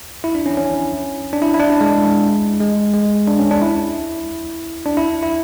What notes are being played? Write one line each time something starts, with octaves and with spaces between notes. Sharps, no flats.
E4
D4
C#4
C#4
D4
E4
E4
D4
E4
G#3
G#3
G#3
D4
C#4
D4
E4
D4
E4
E4